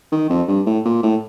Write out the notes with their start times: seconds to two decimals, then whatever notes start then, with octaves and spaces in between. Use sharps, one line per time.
0.12 D#3
0.30 F2
0.48 G2
0.66 A2
0.85 A#2
1.03 A2